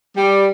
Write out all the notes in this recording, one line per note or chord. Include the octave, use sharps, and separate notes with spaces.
G3